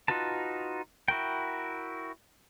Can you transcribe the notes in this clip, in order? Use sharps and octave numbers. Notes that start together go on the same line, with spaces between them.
D#4 F4 F#4 B4 A5
E4 F#4 A#4 G5